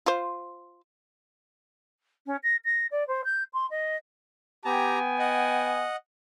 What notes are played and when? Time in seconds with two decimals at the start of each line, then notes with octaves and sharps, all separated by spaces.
0.06 F4 C5
2.26 C#4
2.43 A#6
2.64 A#6
2.91 D5
3.07 C5
3.24 G6
3.53 C6
3.70 D#5
4.65 B3 G4 G5 G#5 A#5
5.19 D#5 F#5